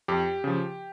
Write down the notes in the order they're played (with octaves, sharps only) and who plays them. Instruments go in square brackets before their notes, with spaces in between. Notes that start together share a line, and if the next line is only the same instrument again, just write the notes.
[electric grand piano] F2 G4
C#3 F3